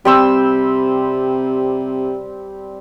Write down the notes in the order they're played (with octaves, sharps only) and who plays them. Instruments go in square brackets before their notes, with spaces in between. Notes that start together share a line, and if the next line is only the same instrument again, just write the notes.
[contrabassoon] C3 [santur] G3 C4 E6